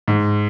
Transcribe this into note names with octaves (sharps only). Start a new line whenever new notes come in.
G#2